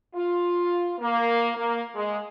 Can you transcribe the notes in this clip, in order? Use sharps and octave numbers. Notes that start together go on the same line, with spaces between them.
F4
A#3
A#3
G#3